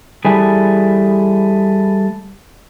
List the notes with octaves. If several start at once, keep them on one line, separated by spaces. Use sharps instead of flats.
E3 G3 A3 G#4 B4